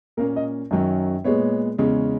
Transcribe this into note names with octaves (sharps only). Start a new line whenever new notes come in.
A#2 A#3 C#4 A#4
D#5
F#2 D#3 F#3 C#4
A#2 G#3 B3 C#5
E2 C#3 G#3 C#4